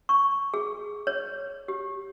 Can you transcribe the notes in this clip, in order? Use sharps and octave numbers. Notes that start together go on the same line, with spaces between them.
C#6
G#4
C#5
G4